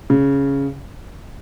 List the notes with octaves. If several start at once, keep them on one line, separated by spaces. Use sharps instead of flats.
C#3